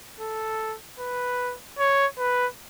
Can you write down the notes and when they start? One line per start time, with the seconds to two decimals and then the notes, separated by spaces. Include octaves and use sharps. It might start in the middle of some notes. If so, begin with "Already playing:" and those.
0.20 A4
0.99 B4
1.79 C#5
2.19 B4